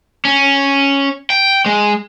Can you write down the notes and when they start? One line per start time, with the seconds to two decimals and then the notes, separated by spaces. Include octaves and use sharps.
0.25 C#4
1.30 G5
1.66 G#3